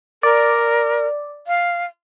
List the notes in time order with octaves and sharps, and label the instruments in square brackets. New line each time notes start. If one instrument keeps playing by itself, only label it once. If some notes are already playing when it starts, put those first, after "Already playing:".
[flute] A#4 [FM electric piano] D5
[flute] F5